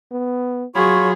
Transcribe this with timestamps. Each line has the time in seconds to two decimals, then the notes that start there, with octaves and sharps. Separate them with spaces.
0.12 B3
0.75 F#3 F4 F#4 G#4 C#5 B5 C#6